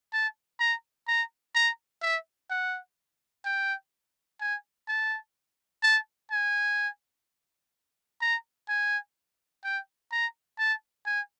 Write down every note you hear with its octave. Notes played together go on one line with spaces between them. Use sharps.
A5
A#5
A#5
A#5
E5
F#5
G5
G#5
A5
A5
G#5
A#5
G#5
G5
A#5
A5
G#5